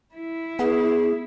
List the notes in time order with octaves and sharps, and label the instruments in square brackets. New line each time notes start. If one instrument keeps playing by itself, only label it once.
[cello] E4
[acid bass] B3 [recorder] G#4